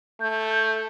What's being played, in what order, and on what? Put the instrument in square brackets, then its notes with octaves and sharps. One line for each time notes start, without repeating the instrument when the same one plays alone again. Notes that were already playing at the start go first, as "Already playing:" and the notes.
[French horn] A3 [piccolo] G6